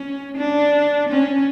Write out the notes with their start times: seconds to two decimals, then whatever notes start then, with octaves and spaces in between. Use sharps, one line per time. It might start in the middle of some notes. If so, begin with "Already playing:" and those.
Already playing: C#4
0.37 D4
1.09 C#4